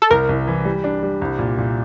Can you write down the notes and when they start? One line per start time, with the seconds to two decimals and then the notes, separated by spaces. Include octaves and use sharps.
0.02 A4
0.11 C2 A#4
0.29 C2
0.47 E3
0.65 G3
0.84 D4
1.03 G3
1.21 C2
1.39 A#2
1.58 A#2